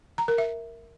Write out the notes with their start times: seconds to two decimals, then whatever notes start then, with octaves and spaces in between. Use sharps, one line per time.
0.18 A#5
0.28 A#4
0.38 E5